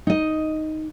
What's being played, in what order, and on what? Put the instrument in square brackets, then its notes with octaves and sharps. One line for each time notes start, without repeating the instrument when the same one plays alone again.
[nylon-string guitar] D#4 D#5